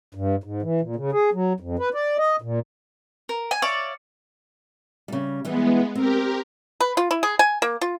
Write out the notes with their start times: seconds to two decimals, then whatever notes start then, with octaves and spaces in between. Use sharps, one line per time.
0.15 G2
0.44 G#2
0.62 E3
0.81 A#2
0.96 C#3
1.12 G#4
1.33 F#3
1.60 F2
1.79 B4
1.94 D5
2.18 D#5
2.42 A#2
3.29 A#4
3.51 G#5
3.62 C#5 D5 E5 F5
5.08 C#3 G3
5.45 E3 G3 G#3 B3
5.95 C4 G4 A#4
6.81 B4
6.97 F4
7.11 E4
7.23 G#4
7.39 G#5
7.62 A#3
7.81 F4